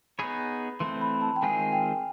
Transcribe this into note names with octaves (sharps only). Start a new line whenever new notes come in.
B3 D#4 G#4 C#5 B5
E3 A3 C4 C6
B5
A5
G5
D#3 G#3 C4 F4 G#4 G#5
G5